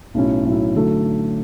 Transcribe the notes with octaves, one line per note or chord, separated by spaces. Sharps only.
B1 A2 F#3 C#4 E4
B1 A2 F#3 C#4 E4
D3 F#3 A3